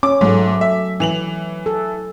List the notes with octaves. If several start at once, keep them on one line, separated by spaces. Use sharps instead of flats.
C#4 D6
G#2 F#3 A3
E5
E3 F7 F#7
A4